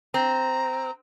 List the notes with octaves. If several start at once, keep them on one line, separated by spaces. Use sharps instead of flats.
C4 A#5